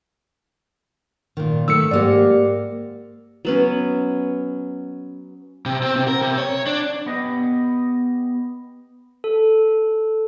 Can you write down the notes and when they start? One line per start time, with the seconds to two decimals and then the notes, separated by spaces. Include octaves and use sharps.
1.37 A#2 D#3
1.68 D#3 A3 E6 C#7
1.91 G#2 A#3 G4 D5
3.45 F#3 B3 C#4
5.66 C3
5.83 C4
5.96 C3
6.08 A#4
6.21 C3
6.38 C#5
6.67 D4
7.06 B3 G4 D#5
9.24 A4